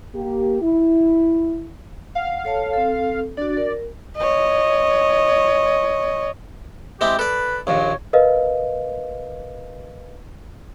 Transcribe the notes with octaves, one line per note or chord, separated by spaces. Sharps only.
A#3 G4
E4
F5 F#5
A4 C#5 A5
C4 A4
D4 F#4 D5
A#4
C#5 D#5
G#3 C4 E4 G4
A4 B4 D5
A#1 D#2 A#2 C#5
A#4 B4 D#5 F5